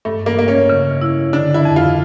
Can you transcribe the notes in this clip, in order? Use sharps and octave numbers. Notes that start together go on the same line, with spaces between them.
G2 A3
A#3
G2 A#3
C#4
C#3
E4
D3 D4
E4
F2
F4